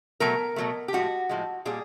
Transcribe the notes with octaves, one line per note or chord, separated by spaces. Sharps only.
B2 F#3 A3 A#4
B2 F#3 A3
G4
A2 F3 G#3 F#4
A2 F3 G#3
A#2 G3 G#4